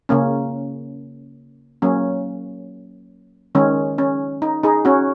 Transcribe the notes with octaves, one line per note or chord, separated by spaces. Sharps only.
C#3 A#3 C#4
F#3 A#3 C#4
D#3 G#3 C#4
C#4
D#4
D#4 G#4
C#4 F#4